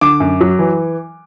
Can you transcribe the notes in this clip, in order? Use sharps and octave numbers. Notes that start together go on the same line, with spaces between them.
D3 D6
F#2
F#3
E3